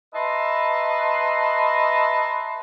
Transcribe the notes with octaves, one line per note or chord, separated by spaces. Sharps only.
B4 D#5 E5 A5 A#5 C6